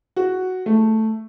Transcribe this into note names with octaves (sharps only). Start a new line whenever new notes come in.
F#4
A3